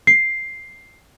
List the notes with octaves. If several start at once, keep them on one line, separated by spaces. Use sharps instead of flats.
C7